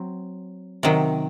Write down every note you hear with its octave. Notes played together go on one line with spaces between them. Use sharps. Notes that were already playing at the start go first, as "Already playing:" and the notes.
Already playing: F#3 C4
C3 D#3 F#3